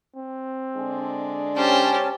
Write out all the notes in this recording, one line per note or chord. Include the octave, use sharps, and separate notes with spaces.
C4
D3 G#3 D4
C#4 G4 C5 A5